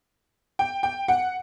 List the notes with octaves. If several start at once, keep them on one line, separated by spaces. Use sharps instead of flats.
G5
G5
F#5